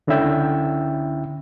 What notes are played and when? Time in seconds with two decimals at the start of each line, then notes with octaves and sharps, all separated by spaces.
0.07 C#2 D3 C#4 E4 E5 G5